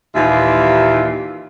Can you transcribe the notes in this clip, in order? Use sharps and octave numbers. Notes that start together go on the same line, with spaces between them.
D#2 A#2 E3 F4 G4 E5